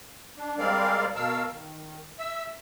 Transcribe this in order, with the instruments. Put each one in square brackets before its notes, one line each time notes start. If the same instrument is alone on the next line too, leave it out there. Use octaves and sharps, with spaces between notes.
[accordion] D4
G3 G#3 C4 A#4 D5 F5
B2 A#4 F5 A5 E6
D#3
E5 E6